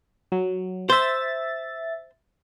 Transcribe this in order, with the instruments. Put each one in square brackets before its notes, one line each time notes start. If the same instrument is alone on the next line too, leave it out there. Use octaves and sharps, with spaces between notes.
[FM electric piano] F#3
[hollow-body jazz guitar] C5 [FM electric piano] E5 A6